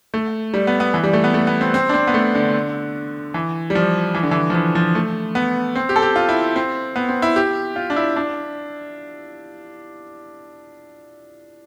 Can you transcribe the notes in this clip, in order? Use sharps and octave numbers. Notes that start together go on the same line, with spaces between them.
A3
G3
B3
B3
E3
G3
A3
B3
A3
B3
C4
C4
D4
C4
B3
A3
D3
E3
G3
F3
E3
D3
E3
F3
E3
F3
A3
B3
C4
G4
A4
G4
F4
E4
C4
B3
C4
E4
G4
F4
D4
E4
D4